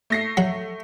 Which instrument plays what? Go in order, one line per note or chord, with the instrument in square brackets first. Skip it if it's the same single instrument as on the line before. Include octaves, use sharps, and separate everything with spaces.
[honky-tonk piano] A3 A#6 C7
[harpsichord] F#3